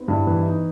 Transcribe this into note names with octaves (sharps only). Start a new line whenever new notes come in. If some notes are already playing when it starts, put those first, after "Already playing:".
Already playing: B3 C4 D#4
G2 E4
E3
E4
D#4